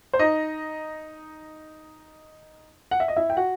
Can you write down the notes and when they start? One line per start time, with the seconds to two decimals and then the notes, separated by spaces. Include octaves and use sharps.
0.13 C5
0.19 D#4 D#5
2.91 F#5
3.00 E5
3.08 D#5
3.16 E4 E5
3.30 G5
3.37 F#4 F#5